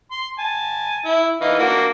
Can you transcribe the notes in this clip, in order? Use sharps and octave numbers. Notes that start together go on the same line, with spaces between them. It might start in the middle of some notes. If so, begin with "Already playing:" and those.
C6
G#5 A5
E4
E3 D#4 F5
A#3 D4 F#4